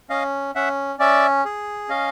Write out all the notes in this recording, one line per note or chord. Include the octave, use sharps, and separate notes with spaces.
C#4 D#5 F5
C#4 E5 F#5
C#4 D5 E5
G#4
C#4 D#5 F5